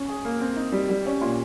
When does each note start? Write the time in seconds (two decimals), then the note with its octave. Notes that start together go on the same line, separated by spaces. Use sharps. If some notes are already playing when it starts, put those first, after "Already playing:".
Already playing: C#4
0.09 G#4
0.25 A#3
0.40 C4
0.56 D#4
0.72 G3
0.89 G3
1.06 C#4
1.21 A#2